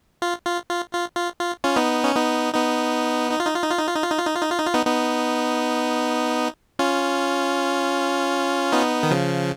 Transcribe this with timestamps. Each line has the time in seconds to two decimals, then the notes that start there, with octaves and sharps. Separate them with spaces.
0.22 F4
0.46 F4
0.69 F4
0.93 F4
1.17 F4
1.40 F4
1.64 C#4 F4
1.76 B3 D#4
2.04 C#4
2.15 B3 D#4
2.54 B3 D#4
3.31 D#4
3.40 F4
3.47 D#4
3.55 F4
3.63 D#4
3.71 F4
3.79 D#4
3.87 F4
3.95 D#4
4.03 F4
4.11 D#4
4.19 F4
4.27 D#4
4.35 F4
4.42 D#4
4.51 F4
4.59 D#4
4.67 F4
4.74 B3 D#4
4.86 B3 D#4
6.79 C#4 F4
8.72 B3 D#4
9.03 D#3
9.11 C#3 F3